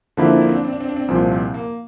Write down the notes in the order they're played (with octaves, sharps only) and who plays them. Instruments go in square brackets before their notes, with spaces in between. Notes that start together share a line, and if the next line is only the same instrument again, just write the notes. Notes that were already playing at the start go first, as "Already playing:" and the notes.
[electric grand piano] D3 F3 A#3 E4 [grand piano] C4
[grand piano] D4
C4
D4
C4
D4
C4
D4
C4
D4
C4
[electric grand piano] C2 A#2 F3 [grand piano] C4
[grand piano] C4
A#3